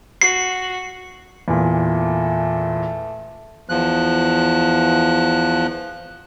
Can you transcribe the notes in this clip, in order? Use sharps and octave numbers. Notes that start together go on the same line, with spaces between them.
F#4 C7
E2 A#2 A3
E2 F3 F#6